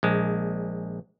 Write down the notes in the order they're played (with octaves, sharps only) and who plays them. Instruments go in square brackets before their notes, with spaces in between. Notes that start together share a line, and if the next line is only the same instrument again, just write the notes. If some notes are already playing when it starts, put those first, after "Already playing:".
[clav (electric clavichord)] A#1 G#3